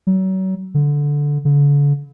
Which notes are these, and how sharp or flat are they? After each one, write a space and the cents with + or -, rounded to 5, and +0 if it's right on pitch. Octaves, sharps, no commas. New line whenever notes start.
F#3 +35
D3 -10
D3 -40